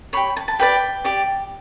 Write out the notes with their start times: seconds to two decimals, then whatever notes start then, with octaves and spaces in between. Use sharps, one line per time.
0.13 G4 C#5 B5
0.37 A5
0.48 A5
0.59 G4 B4 D5 G5
1.04 G4 D5